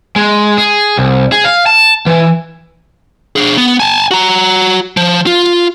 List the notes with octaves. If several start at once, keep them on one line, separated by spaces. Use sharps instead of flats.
G#3
G#4
C2
G#4
F5
A5
E3
D4 G#4
B3
G#5 A5
F#4 A#5
F3
F4